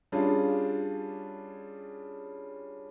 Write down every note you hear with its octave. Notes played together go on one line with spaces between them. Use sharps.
G3 C#4 D4 F4 G#4